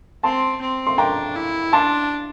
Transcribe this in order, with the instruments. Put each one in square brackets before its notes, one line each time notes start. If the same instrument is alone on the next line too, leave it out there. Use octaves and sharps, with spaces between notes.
[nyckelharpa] C4 [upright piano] A5 C6
[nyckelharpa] C4
[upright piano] C6
[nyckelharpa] D4 [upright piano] G5 A#5
[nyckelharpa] E4
[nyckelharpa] D4 [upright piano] A5 C6